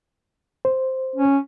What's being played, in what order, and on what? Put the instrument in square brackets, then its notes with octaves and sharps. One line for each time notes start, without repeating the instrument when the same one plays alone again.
[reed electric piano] C5
[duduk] C#4